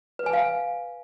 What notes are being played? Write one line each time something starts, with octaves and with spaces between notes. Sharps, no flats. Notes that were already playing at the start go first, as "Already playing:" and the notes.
B4
G#5
F5